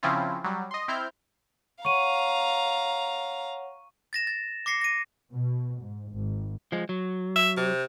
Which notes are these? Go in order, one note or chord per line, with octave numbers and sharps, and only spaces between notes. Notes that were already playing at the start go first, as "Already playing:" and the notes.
C#3 F3 C4 C#4 E4 F4
F#3 G3
D#5 C6
C4 E4 F6 G6
C#5 F5 F#5 A#5 C#6 D#7
A6 A#6 E7
A6
D6 A#6 C7 C#7
A#6 D#7
B2
G#2
G#1
F3 G#3
F#3
E5
C3